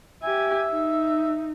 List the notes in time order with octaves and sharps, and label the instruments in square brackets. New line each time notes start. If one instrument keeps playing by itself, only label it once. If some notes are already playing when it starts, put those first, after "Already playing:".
[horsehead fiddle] G4 G#5 [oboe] E5
[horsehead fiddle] D#4